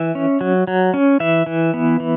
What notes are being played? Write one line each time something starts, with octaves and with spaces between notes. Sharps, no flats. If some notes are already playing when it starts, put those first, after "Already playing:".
Already playing: E3 E5
C#4
F#3
F#3
C#4
E3 E5
E3
B3
E3